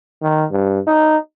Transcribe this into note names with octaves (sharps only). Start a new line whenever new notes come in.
D#3
G2
D#4